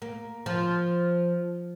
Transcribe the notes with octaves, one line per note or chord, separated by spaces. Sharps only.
A#3
F3